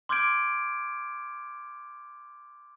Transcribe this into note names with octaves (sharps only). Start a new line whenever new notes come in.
C6 D6 F6 G6 G#6 D7